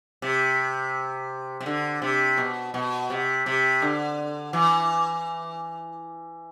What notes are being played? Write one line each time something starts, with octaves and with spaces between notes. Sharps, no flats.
C3
C3
D3
C3
B2
B2
C3
C3
D3
E3